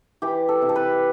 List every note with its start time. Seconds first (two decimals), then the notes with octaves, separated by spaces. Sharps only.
0.22 E3 G4
0.49 A4
0.62 C3
0.69 A4
0.76 B4